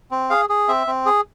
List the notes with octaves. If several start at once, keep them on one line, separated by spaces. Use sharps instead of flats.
C4
G#4 F5
G#4
C4 E5
C4
G#4